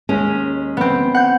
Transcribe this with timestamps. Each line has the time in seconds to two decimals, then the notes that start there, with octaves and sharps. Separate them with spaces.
0.09 D#2 G#3 C#4
0.77 B3 C4
1.14 F#5 G6